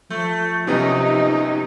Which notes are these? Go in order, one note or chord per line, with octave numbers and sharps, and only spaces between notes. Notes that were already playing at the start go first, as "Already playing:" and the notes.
F3 A3
F#2 C3 B3 C#4 D#4